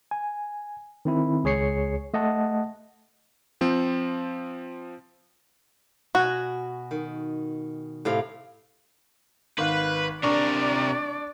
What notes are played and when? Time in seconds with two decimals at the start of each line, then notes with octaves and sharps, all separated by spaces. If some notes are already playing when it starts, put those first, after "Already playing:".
0.11 G#5
1.05 D#3 C4 E4
1.44 C#2 G#4 C#5 C7 C#7
2.14 A3 D#5 F#5 A5
3.61 F3 C4
6.15 B2 F#4 G#5
6.91 D#3
8.05 A2 C3 F5
9.58 G#1 B4 F5
10.23 C3 D4 A#4 D5 C#6